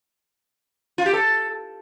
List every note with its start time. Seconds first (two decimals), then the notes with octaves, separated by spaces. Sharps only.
0.98 F4
1.06 G4
1.13 A4